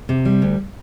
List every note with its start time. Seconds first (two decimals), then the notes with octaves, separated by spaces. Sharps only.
0.09 C3
0.25 G3
0.42 D2